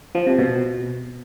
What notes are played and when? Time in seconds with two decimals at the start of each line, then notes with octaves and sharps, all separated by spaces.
0.15 F3
0.27 C3
0.38 B2